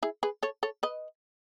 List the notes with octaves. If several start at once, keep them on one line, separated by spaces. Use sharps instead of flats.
E4 G#4
G#4 B4
A4 C#5
A4 C#5
B4 D#5